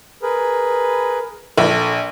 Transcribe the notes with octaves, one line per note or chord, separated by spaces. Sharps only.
G#4 A#4 B4
A#1 A4